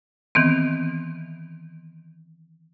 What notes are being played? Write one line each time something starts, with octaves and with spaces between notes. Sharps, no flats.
D#3 E3 B3 C4